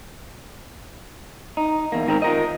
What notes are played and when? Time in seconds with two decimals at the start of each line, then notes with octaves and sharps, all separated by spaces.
1.57 D#4
1.92 E2 A#3
2.07 G#2 D#3 C4 G#4 A#4
2.22 F4 A#4 D#5